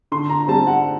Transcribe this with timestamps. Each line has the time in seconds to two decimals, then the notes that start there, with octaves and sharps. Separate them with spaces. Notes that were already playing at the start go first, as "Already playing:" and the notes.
0.12 D3 C6
0.30 A#5
0.48 G3 C4 A5
0.67 F#5